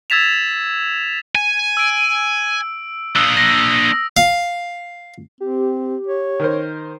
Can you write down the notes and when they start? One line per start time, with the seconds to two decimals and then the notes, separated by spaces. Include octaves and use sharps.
0.10 E6 G#6 A6 B6 E7 F7
1.35 G#5
1.77 E6 D7
3.16 A#3 D4 D#6 E6
3.37 A#6
4.17 F5
5.40 C4 G4
6.07 C#5
6.40 D#3 A#4 C5